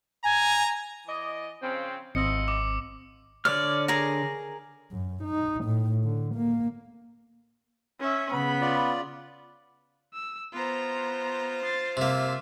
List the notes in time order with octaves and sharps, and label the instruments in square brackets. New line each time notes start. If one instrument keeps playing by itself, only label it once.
[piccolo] G#5 [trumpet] A#5
[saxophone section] E3 D5 D#5
C#3 F3 C4
[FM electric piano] G#1 C4 [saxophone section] A2 F4 D#5 [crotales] E6 C#7
[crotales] D6
[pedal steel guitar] D3 C#5 F6 [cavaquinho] D5
[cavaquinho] G#4 A#4 A#5
[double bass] F#2
D#4
A2
D3
A#3
[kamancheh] C#4 E5
[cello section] C#3 [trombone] B3 [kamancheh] B5
[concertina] F4 D5
[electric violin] E6
[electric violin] B3 A#5 [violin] F4 C5
[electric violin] A6 C7
[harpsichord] C3 A#3 [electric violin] E5